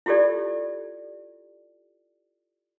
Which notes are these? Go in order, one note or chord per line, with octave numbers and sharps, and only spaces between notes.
E4 F4 G4 A4 D5